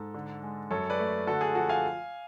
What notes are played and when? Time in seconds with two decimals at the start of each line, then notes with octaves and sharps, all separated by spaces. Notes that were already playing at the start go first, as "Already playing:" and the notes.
Already playing: G#2 A4
0.14 D3
0.43 G#3
0.71 F#2 A4 C#5
0.90 B4 D5
0.99 A3
1.27 D3 F#4 A4
1.41 G#4
1.55 F3 F#4 A4
1.69 F5 G#5